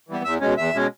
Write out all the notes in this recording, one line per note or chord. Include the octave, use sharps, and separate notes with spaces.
E3 G3 B3
E2 E5
B2 G#3 C#4
E2 E5
B2 G#3 C#4